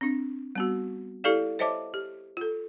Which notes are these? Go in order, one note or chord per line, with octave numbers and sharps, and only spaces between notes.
C4 D4
G3 B3 F#4
E4 G4 A4 D5 F5
C5 C#5 D#5 E5 A5 D6
G4
F4 A4